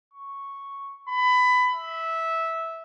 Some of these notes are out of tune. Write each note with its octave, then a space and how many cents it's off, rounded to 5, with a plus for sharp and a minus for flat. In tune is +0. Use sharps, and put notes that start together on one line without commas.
C#6 -5
B5 +20
E5 -10